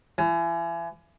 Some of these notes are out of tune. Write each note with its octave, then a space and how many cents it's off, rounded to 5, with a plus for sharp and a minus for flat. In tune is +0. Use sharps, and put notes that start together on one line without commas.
E3 +35